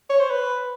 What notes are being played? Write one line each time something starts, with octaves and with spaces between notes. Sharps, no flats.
C#5
C5
B4